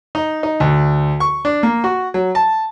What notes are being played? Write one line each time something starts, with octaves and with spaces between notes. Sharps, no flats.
D#4
D#4
D2
C#6
D4
A#3
F#4
F#3
A5